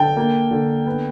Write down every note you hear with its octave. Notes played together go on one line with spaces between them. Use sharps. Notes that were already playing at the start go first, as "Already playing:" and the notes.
Already playing: D3 G5 A5
A#3
D3
B3